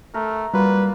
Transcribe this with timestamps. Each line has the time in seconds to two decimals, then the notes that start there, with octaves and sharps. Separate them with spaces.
0.14 A3 A#4
0.54 G3 A#3 F4 F#4 B4